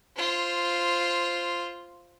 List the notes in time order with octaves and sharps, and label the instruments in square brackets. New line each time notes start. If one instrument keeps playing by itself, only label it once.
[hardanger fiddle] F4 C5